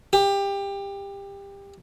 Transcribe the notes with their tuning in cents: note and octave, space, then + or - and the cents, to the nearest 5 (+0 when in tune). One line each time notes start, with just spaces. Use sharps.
G4 +20